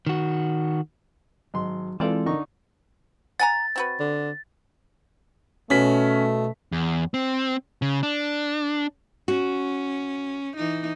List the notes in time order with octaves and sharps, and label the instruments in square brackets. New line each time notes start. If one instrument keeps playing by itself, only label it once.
[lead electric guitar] D#3 F#4
[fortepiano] G#1 C6 [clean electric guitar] F#3
[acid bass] E3 [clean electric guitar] G#3 [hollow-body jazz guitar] C4 D5 [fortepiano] F4 A4
[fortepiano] D3 D#4 C#6 [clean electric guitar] A#4
[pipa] F#5 G#5 A#5 [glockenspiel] A6
[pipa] C4 F#4 B4
[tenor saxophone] D3
[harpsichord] B2 [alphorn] A3 [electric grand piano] C#4 B6
[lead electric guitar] E2
C4
C#3
D4
[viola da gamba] C#4 [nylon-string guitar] F#4
[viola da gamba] E3 D#4